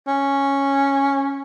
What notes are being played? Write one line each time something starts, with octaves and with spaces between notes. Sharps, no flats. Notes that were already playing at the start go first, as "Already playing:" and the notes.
C#4